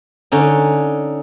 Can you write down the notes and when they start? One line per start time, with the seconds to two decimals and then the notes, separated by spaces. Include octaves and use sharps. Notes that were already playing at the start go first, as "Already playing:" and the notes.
0.32 D3 C#4 D#4